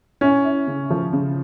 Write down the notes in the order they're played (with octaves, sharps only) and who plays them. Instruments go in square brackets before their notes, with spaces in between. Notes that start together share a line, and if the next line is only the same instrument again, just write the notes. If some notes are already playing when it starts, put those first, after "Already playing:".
[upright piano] C#4 [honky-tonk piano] E4
[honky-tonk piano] E4
C#3
F3
C#3